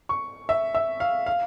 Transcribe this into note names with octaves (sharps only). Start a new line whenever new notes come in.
C#6
E5
E5
F5
F5